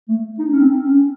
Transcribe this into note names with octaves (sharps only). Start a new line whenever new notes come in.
A3
D#4
D4
C#4
C4
C#4